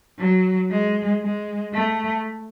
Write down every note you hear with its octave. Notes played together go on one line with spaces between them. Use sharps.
F#3
G#3
G#3
A3